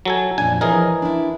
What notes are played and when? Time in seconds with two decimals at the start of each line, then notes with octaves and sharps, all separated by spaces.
0.05 F#3 A4 G#5
0.38 F2 A#2 D4 G#5
0.61 E3 F3 G#4 A#4 C#5 D#5
1.02 D4 E4